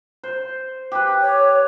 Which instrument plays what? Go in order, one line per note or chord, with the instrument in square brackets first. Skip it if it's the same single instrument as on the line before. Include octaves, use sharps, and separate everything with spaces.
[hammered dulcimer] C5
G4 B4
[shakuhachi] C#5